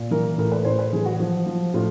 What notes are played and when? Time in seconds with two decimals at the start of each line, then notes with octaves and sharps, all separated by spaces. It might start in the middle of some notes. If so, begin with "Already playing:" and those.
Already playing: A#2
0.11 E3 A#4
0.24 A#4
0.38 A2 A#4
0.52 B4
0.65 A2 C5
0.79 B4
0.92 E3 G#4
1.06 F#4
1.20 F3
1.46 F3
1.74 A2 F4